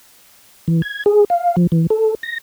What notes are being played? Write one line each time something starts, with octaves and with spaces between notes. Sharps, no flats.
E3
G#6
G#4
F5
F3
E3
A4
A#6